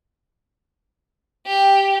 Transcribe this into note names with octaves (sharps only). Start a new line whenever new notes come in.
G4